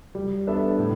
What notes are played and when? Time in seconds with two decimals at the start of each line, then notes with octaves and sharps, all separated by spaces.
0.15 G3
0.47 B3 D4 A4 E5
0.79 A2